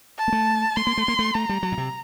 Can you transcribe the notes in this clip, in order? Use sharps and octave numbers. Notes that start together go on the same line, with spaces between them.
A5
A#3
A3
A3 C6
A#3
A3
A#3
A3
A3 A#5
G3
F#3
A#2
C3